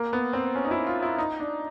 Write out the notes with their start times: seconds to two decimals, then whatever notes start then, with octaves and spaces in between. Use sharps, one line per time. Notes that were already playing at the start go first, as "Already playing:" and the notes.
Already playing: A#3
0.13 B3
0.33 C4
0.55 C#4
0.65 D#4
0.71 E4
0.87 F4
1.03 E4
1.18 D#4
1.40 D4